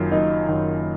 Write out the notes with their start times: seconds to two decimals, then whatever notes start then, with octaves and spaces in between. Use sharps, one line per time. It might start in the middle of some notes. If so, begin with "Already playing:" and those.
Already playing: F#1 F#2 D#3 F4
0.12 F#1 D#4
0.48 F#2 D#3